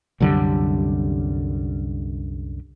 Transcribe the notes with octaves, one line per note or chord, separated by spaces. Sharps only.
C2 F#2 D3 G3